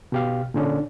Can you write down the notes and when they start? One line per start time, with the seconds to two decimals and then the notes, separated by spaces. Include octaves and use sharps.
0.12 B2 G4 F5
0.54 A#2 D3 C#4 D4